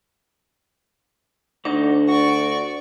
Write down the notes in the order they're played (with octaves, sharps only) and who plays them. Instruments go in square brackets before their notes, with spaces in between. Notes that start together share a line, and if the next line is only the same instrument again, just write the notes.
[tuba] D2 [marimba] D4 [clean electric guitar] D#4 F#4 D5
[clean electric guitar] F#4 [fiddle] D5 C#6